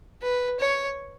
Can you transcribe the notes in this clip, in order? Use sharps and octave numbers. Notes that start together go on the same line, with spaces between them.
B4
C#5